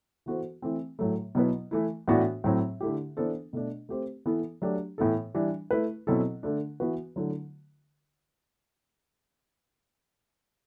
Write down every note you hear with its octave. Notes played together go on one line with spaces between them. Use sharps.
E3 B3 F#4 A4 C5
E3 A3 C4
A2 F#3 A3
B2 F#3 B3 E4 B4
E3 A3 E4
A2 E3 B3 D4 F#4
A2 F#3 C4
D3 A3 E4 G4
E3 B3 D4 A4 C5
B2 A3 D4
A3 C4 G4 C5
E3 B3 E4 A4
F#3 A3 D4 G4
A2 E3 B3 E4 A4
E3 G3 D4
A3 E4 B4
B2 F#3 C4 E4 A4
D3 A3 D4
E3 B3 F#4 B4
D3 F#3 A3 E4